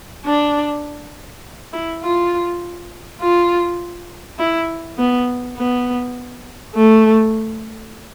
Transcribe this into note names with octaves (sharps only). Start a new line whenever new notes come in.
D4
E4
F4
F4
E4
B3
B3
A3